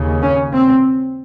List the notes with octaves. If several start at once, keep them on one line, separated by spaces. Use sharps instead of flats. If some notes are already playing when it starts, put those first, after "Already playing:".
Already playing: D#2 C#3
C#4
C4